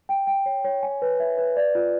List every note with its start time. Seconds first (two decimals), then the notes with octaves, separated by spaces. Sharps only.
0.09 G5
0.27 G5
0.46 C#5
0.64 C#5
0.83 G#5
1.02 B4
1.20 E5
1.38 B4
1.56 D5
1.75 F4